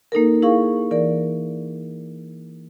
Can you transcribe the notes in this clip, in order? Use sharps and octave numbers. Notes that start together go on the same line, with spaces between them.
A#3 D#4 A4 A#4
E4 G#4 A#4 F5 C#6
E3 A#4 D5